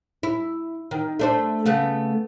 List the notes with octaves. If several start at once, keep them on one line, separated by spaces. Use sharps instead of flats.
E4
D#3
A3 D4 C5
C#3 A3 B3